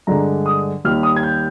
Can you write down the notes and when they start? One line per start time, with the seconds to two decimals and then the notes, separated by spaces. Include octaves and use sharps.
0.07 G2 D3 G#3 A#5
0.46 D#6
0.84 D#2 D#3 G3 F6
1.03 D#6
1.16 G#6
1.23 G6